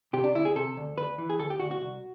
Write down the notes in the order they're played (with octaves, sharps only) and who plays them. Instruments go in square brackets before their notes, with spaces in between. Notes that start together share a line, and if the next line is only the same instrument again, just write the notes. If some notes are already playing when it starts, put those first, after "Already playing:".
[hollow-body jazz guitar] C3 G4
D4
D2 E4
G#4
C3 A4
D2
D2 B4
E3
G#4
D2 A4
G4
D2 F#4
F#4
C2